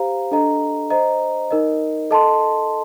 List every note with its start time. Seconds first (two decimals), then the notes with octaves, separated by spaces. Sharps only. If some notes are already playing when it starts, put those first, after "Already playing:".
Already playing: G4 C5 F5 A#5
0.31 D4 A4 D#5 A#5
0.90 C5 D#5 A#5
1.51 D#4 A#4 D#5
2.11 A4 D#5 A5 C6